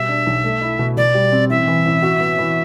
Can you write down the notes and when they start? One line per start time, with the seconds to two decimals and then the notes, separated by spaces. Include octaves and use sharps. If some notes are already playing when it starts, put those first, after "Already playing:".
Already playing: B2 G3 E5
0.08 D4
0.26 B1
0.44 A3
0.61 E4
0.79 B2
0.97 B2 D5
1.14 G3
1.32 C4
1.50 A1 E5
1.68 E3
1.85 A1
2.02 F#4
2.20 B3
2.38 E3